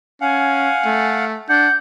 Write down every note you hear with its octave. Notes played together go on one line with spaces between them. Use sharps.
C#4 F5 F#5 G#5
A3
D4 F#5 G6